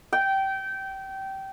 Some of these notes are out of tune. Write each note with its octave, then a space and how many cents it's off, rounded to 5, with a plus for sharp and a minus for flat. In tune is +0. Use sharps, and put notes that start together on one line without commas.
G5 -20